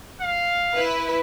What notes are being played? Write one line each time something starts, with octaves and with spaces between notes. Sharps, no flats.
F5
E4 B4